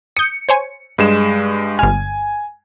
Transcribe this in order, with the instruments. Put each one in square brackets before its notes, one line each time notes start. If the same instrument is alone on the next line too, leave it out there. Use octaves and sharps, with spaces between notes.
[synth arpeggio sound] D#6 G6 [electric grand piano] C#7
[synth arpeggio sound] C5 C#5 G#5
[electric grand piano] G2 G#3 E7
[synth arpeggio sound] G1 F6 [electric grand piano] G#5